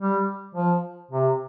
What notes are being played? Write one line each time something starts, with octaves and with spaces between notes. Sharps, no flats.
G3
F3
C3